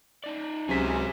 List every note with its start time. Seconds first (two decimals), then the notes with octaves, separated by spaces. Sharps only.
0.24 D#4 D5
0.69 C#2 C3 F#3 C4 C#4 G#4 B6